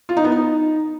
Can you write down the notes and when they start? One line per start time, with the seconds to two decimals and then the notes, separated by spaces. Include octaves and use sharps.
0.09 F4
0.17 D#4
0.24 B3
0.32 D#4